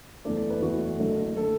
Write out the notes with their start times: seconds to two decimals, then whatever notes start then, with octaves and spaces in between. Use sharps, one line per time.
0.25 F#1 E2 E3 A3 D5
0.37 D5
0.50 B4
0.62 F#1 E2 E3 A3 F#4
1.00 F#1 F#2 D3 A3
1.37 D3 A3 A4